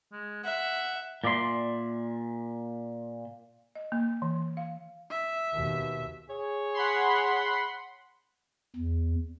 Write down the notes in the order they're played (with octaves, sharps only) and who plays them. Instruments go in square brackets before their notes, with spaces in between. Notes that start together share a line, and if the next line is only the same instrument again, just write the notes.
[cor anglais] G#3
[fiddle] E5 [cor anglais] F#5
[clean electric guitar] A#2 D5 E5 C6
[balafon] D#5
A#3
E3
F5
[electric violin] E5
[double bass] D#2 B2
[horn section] G#4 C#5
[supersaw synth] F#5 B5 C6
[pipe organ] E2